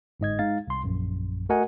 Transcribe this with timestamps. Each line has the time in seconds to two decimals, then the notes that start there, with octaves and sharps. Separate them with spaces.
0.20 G1 G#2 D#5 G#6
0.39 G#3 D#4 F5 A6
0.67 C2 C6
0.84 A#1 F#2
1.49 A3 F#4 A#4 D#5 F#5 G#5